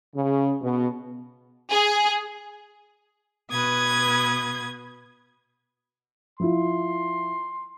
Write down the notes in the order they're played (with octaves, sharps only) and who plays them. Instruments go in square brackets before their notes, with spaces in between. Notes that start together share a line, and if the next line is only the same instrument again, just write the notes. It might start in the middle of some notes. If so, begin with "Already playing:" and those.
[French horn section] C#3
B2
[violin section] G#4
[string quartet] B2 G#6 [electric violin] B4 D#6
[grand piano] F3 E4 F4 [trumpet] C6